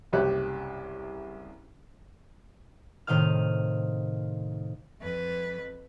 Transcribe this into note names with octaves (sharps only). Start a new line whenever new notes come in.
F#1 C2 G4 C#5 E5 F#6
A2 C3 D#3 D#5 F5 F6
F2 B4